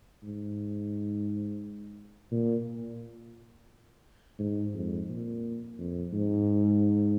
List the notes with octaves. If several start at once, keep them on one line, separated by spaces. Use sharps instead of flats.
G#2
A#2
G#2
F2
A#2
F2
G#2